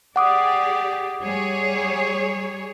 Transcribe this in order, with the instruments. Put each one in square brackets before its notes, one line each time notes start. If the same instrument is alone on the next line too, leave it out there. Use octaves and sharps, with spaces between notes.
[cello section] G4 G#4 D5 [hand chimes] F#5 D6 D#6
[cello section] G3 G#4 C#5